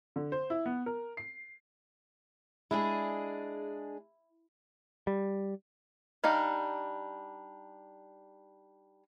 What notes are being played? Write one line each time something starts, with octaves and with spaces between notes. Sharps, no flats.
D3
C5
E4
B3
A#4
C7
G#3 D4 E4 G#4
G3
G3 D4 D#4 F5